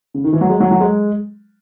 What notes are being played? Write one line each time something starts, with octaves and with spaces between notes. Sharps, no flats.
C#3
D#3
E3
F#3
G#3
F#3
F#3
G#3